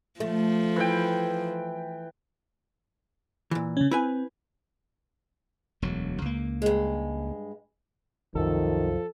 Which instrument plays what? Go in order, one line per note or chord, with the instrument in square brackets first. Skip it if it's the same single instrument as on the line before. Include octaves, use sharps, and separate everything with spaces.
[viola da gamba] F3 [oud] A3
[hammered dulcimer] E3 G5
[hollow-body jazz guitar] A#2 E3
[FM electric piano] C#3 C#4
[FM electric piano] C4 [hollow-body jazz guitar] E4 B4 G#5
[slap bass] E1 D2 F#3
C#2 A#3
[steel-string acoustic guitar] G2 G#3
[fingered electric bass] C2 F#2 [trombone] D#3 [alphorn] F3 [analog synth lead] A4